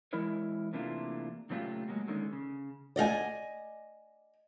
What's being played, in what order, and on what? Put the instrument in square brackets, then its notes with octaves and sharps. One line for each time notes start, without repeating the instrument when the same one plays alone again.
[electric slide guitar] E3 G#3 E4 A#4 C#5
C3 E3 A3 A#3 D4 F4
A#2 C#3 F#3 A3 F4 G4
F#3 G#3 A#3 F#4
D3 D#3 G#3 C#4
C#3
[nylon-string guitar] D5 D#5 F5 G#5